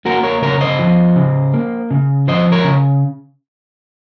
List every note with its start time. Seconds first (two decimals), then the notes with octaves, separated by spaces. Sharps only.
0.05 A#3 F#4 A#4
0.24 A#4 C#5
0.42 C#3 A#4 C#5
0.61 C5 D#5
0.79 F3
1.16 C#3
1.54 A#3
1.91 C#3
2.28 F3 C5 D#5
2.52 A#4 C#5
2.64 C#3